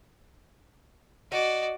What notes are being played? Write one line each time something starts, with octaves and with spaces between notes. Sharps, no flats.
F#4 D5 D#5